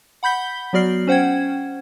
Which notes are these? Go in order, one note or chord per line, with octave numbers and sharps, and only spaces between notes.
F#5 B5 G6 B6 G7
F#3 B3 F#4 D5 F6 C7
C#4 C5 F#5 G5 G#6